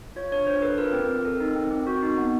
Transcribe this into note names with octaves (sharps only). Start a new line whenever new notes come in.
F4 C#5
D4 C#5
D4 C5
A4 B4
F4 A#4
C4
C4
A4
D#4
C4
C4
F#4
D#4
B3